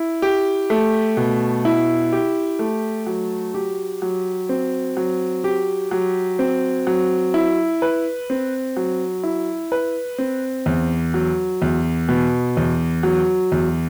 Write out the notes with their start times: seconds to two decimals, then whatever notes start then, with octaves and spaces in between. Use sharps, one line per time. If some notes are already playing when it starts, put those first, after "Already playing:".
Already playing: E4
0.22 G4
0.70 A3
1.17 B2
1.65 E4
2.13 G4
2.59 A3
3.07 F#3
3.54 G4
4.02 F#3
4.49 C4
4.97 F#3
5.44 G4
5.91 F#3
6.39 C4
6.87 F#3
7.34 E4
7.82 B4
8.30 C4
8.77 F#3
9.23 E4
9.72 B4
10.18 C4
10.66 E2
11.14 F#3
11.62 E2
12.09 B2
12.57 E2
13.03 F#3
13.52 E2